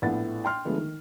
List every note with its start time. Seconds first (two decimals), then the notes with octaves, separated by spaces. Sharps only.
0.02 A#1 A2 B3 F#5 A6
0.45 G5 C6 F6
0.65 D3 F3 G#3 A3 B3
0.77 D#3